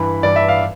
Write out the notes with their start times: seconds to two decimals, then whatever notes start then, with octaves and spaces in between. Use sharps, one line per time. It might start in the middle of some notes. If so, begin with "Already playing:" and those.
Already playing: G2 E3 B5
0.23 G2 E3 D5
0.36 E5
0.48 F5